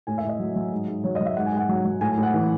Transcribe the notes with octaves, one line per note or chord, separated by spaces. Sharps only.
A2 G#5
E5
A2
D#5
F#3
F#3
G#2
G#2
F#3 C#5
D#5
F#3
E5
G#2 F#5
G#5
G#2 F#5
F#3
F#3
A2 G#5
G#5
A2
F#5
E3